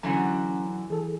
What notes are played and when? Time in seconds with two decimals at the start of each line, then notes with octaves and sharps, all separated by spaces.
0.03 D3 E3 F#3 C#4 F#4 C#5 F#5 A#5
0.90 E3 G#4 A4